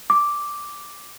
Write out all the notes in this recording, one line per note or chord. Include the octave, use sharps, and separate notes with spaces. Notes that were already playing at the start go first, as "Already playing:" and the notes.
D6